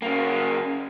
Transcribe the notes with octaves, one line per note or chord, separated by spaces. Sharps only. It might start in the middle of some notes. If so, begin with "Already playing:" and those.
C#3 A#3